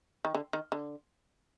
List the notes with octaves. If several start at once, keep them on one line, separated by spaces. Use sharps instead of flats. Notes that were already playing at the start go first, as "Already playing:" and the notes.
D#3
D3
D#3
D3